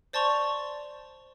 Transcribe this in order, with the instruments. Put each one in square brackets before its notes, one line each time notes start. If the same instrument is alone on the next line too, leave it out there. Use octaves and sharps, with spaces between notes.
[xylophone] C5 D5 A5 C6 C#6 F7